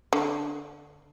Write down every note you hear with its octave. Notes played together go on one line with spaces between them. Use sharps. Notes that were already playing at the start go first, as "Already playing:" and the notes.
D3